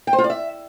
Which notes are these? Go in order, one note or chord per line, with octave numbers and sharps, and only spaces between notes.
G5
C5
F4
D5
E5